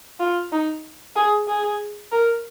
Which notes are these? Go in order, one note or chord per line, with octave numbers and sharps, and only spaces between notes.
F4
D#4
G#4
G#4
A#4